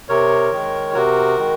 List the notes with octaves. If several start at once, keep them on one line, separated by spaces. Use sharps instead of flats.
C3 A#4 C#5
D#3 G#3
C3 F#4 A#4
D#3 G#3